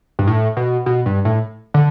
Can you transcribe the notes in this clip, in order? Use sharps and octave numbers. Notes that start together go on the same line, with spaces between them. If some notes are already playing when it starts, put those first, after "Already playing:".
G2
A2
B2
B2
G2
A2
D3